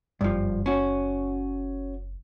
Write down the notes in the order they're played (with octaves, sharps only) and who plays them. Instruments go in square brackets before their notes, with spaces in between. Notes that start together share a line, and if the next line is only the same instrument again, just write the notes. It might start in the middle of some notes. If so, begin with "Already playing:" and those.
[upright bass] F#1 [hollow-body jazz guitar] G2 F3
[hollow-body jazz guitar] C#4 F#4